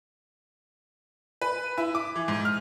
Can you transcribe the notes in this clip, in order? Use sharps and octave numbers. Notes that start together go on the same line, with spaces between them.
B4
E4
D6
E3
G#2
F6